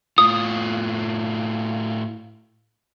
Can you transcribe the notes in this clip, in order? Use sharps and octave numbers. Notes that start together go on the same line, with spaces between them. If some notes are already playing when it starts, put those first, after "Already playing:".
A2 F4 D#6